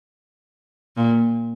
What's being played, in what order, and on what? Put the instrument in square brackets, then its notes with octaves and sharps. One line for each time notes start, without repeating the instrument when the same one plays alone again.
[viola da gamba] A#2